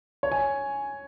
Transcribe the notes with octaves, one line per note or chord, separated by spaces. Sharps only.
C#5
G#5